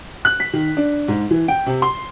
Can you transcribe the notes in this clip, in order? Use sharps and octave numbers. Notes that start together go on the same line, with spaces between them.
F#6
B6
D#3
D4
G#2
E3
G5
C3
C6